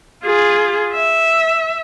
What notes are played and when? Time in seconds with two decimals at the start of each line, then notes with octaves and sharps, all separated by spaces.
0.24 F4 G#4
0.93 E5